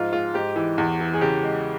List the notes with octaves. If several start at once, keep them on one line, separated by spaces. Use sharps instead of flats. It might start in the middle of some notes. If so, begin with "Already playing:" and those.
Already playing: G#2 F3 F4
G#3 F4
G#2 G4
E3
E2
E3
G#4
C#3 G4
G#3